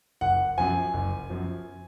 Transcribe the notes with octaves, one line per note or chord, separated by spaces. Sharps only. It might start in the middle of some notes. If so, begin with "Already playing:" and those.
F#1 F#5
F#2 F3 G#5
F#1
F#2 F3